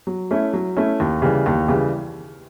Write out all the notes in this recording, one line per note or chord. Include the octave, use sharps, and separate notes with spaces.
F#3
A3 C#4 E4
F#3
A3 C#4 E4
D#2
C#3 E3 G3
D#2
C#3 E3 G3